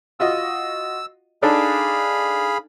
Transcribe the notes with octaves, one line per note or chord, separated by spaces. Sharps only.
F4 F#4 D#5 E6
D4 D#4 G#4 A4 F5 B5